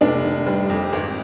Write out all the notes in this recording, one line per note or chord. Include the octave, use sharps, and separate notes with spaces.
F1 D4 D5
D#3
G3
F2
G#1